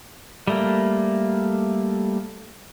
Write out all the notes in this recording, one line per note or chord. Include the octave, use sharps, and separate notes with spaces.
G3 A3 A#3